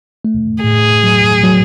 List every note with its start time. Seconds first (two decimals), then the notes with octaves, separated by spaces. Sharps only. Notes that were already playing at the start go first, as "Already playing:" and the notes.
0.25 A3
0.63 A2 G#4
1.04 F#3
1.44 F#3